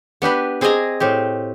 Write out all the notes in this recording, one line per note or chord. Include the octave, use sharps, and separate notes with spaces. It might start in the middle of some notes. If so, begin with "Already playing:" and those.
B3 D4 G4 B4
C4 G#4 D5 D#5 G#5 A#5
A2 C4 G4